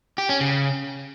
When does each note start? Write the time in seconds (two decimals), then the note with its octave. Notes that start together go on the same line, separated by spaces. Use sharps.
0.18 G4
0.29 C#4
0.40 C#3